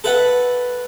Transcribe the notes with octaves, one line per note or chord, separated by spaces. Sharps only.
A4 B4 E5 F#5